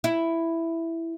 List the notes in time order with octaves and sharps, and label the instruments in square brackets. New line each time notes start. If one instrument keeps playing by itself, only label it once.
[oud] E4